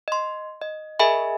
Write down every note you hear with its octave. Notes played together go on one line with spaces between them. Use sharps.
D#5 C6
D#5
G#4 A#4 D#5 E5 G#5 B5